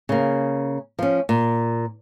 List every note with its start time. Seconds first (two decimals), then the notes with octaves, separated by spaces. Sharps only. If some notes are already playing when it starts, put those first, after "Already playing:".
0.09 C#3 A#3
0.99 F3 C#4
1.29 A#2